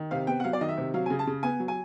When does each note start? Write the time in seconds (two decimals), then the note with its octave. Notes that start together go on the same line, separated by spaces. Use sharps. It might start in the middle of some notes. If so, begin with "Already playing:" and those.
Already playing: D#3
0.11 C3 F5
0.27 B3 G5
0.40 F#5
0.44 F#3 F5
0.53 D5
0.61 D#3 D#5
0.69 E5
0.77 C3
0.94 F#3 F5
1.06 G#5
1.10 C#3
1.19 A5
1.27 C#3
1.43 B3 G#5
1.60 F#3
1.68 G#5